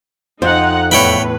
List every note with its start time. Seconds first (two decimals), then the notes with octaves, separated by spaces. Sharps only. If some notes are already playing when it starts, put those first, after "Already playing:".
0.42 F2 D#4 C5 F#5
0.91 E2 A2 E3 B4 C#5 G5 B5